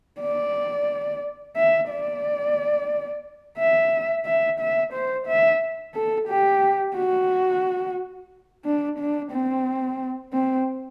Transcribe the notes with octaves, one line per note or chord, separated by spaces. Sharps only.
D5
E5
D5
E5
E5
E5
C5
E5
A4
G4
F#4
D4
D4
C4
C4